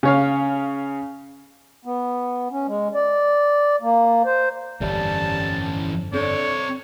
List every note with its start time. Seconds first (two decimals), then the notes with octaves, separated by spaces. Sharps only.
0.03 C#3 C#5 F5
1.85 B3
2.51 C#4
2.67 G#3
2.94 D5
3.82 A#3
4.25 C5
4.81 G1 F2 E3 G3 C#4 A5
6.14 D3 C4 C#5 D5